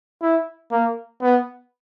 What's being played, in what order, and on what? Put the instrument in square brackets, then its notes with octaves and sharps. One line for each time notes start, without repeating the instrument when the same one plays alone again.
[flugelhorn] E4
A#3
B3